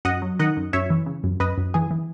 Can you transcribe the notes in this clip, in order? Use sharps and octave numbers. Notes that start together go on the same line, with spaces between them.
F#2 D#5 F#5
F#3
D#3 D#5 F#5
F#2
F#2 C#5 E5
E3
C#3
F#2
F#2 B4 D#5
F#2
E3 G#4
E3